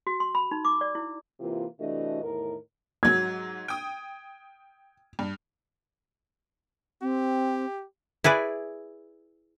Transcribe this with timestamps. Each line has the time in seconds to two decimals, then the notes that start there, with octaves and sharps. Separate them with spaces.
0.07 F#4
0.20 C6
0.35 B5
0.51 D#4
0.65 D6
0.81 D5
0.95 E4
1.40 C3 E3 A#3 F4
1.79 C3 E3 A3 D4 F#4 D#5
2.22 E2 A2 D#3 A#4
3.03 G#2 F#3 G#6
3.68 G5 D#6
5.19 G2
7.02 C4 G4
8.24 E4 G#4 B4 D5